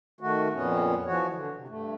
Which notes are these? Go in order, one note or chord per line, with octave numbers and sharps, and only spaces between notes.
D#3 A3 F#4
F2 A#2 B3 C#4
E3 F3 F#4 C#5
D3
C3
G2 A3